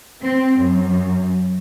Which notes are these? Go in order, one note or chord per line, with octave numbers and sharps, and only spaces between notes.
C4
F#2